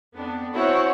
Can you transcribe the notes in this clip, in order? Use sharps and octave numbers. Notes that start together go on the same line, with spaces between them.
F2 B3 D4
C4 C#4 E4 F#4 C#5 F#5